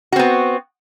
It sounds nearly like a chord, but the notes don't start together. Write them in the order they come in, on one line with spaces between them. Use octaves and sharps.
F#4 C4 B3